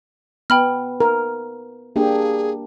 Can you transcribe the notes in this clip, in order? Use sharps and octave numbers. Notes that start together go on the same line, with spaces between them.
B3 G5 B5 F6
A#4
A#3 D4 G4 G#4